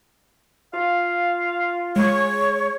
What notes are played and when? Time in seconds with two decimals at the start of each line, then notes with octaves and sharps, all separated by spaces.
0.74 F4 F5
1.96 G#3 C#5 C#6